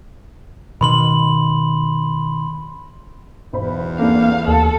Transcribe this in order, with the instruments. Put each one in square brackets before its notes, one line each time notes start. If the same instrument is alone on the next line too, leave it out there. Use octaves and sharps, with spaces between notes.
[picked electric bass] B2 D#3 [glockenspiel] B5 C6 F#7
[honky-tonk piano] B1 C5 B5 [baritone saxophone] E2
[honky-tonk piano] F2 A3 D4 [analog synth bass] A#3 [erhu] F5
[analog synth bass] D#2 [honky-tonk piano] A3 [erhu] A4